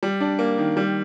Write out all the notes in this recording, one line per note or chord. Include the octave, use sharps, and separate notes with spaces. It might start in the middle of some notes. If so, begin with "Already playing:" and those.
G3
D4
A#3
D#3
G3